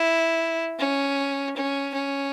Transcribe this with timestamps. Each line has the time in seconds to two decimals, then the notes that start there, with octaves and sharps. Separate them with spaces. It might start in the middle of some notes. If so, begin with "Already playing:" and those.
Already playing: E4
0.79 C#4
1.56 C#4
1.94 C#4